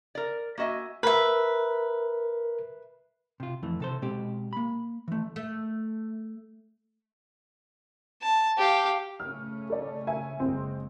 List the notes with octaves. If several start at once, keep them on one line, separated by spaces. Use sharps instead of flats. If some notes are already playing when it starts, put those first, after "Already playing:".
A#4 D5
A#3 F#4 D#5 E5 G#5
A#4 B4 E5
C3 F4
F2 E3 A3
C3 A4 C5
B2 G#3 C4 G4
A#3 B5
E3 A3
A3
A5
G4 F5
C#3 A3 C#4 F6
A4 D5
E5 G#5
F#1 C#3 G#3 C4